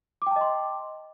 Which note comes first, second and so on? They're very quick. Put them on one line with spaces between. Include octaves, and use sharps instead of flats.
D6 G5 A5 D#5 C6